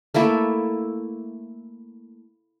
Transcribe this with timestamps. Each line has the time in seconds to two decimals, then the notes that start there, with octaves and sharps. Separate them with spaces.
0.14 A3 A#3 E4 A4